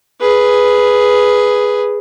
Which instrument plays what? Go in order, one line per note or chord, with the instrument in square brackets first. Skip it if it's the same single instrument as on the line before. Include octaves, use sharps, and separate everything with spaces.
[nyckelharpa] G#4 B4